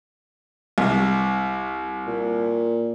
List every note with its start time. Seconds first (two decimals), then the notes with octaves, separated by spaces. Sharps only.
0.78 C2
2.07 A#2